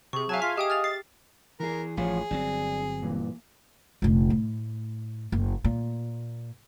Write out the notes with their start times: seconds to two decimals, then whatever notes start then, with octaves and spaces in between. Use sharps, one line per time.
0.13 C3 G#4 C#6
0.29 F#3 E5 F5 G#5 A5
0.42 F4 B6
0.58 G4 D#5 G5 D#6
0.70 F6 A6 F7
0.84 A6 C7
1.60 E3 G#4 A#4
1.97 A1 F3 F4 G#4 C#5
2.31 G1 F#3 C4 D4
3.02 G2 A#2 E3
4.02 F1 A#1
4.30 A2
5.32 F#1
5.64 A#2